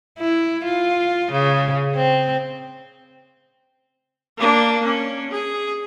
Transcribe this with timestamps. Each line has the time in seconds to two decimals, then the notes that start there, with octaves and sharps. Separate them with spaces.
0.19 E4
0.65 F4
1.32 C#3
1.96 C4
4.37 A#3 D4
4.85 C#4
5.31 G#4